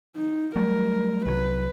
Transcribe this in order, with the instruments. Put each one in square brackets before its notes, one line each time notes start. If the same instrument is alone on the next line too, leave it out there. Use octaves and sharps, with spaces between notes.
[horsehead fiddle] D#4
[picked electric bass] F#3 G3 A3 [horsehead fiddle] A#4
[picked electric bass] C2 E3 F#3 [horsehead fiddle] B4